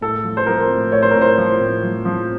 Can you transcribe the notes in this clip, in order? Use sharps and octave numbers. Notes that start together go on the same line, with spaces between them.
A2 A4
F3
C5
F3 A#4
A2
A2 C#5
C5
A2 A#4
C5
F3
A2
F3
F3